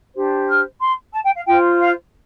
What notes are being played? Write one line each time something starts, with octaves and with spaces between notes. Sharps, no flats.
D4 G4 C5
F6
C6
A5
G5
F5
F4 C5 G5
F5